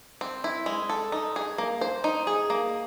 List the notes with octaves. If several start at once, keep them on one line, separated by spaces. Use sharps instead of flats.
C4
E4
G#3
A4
D#4
G#4
A#3
C5
D#4
G#4
A#3